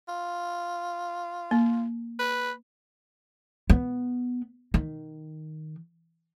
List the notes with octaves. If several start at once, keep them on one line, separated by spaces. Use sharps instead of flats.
F4
A#3
B4
B3
D#3